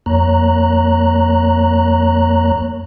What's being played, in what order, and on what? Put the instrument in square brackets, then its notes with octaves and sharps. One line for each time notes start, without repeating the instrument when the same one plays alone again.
[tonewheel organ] F2 A#3 C#5 A#5 F#6